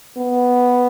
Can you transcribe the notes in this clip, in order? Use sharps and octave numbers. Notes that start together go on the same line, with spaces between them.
B3